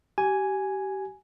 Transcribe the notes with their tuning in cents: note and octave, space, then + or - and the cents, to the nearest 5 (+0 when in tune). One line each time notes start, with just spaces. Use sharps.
G4 -30 G#5 +0